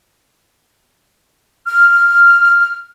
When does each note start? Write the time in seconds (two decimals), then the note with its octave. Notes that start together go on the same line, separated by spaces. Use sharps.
1.66 F6